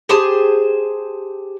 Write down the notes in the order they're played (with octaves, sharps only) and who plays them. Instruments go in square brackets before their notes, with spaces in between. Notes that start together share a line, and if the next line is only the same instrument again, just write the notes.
[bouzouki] G4 G#4 C5 A5